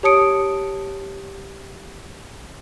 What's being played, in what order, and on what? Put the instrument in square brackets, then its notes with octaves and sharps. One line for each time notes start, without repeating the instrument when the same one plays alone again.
[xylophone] G4 C#5 A5 D#6 C#7 D7